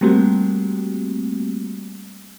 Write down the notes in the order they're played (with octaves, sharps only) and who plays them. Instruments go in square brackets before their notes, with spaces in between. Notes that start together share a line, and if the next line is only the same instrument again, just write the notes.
[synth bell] G3 A3 A#3 C4 F#4 G4